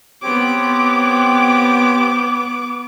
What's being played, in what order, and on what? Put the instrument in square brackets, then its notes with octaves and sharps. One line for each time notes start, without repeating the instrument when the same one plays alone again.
[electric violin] B3 D6 [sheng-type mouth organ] C4 G4 C#5